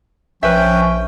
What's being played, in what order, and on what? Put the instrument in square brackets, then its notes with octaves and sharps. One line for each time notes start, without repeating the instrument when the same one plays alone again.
[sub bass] A#1 [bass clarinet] F3 [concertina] C#4 G5 [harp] B4 E5